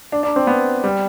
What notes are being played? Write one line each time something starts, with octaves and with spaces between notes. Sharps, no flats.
D4
D4
C4
B3
G3